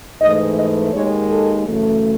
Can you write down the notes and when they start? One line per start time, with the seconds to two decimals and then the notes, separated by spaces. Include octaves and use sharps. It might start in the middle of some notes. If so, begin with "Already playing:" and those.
0.22 G#2 E3 A3 D#5
0.57 D#5
0.93 D#2 D#3 G#3 C#5
1.29 A4
1.65 F#2 C#3 E3 A3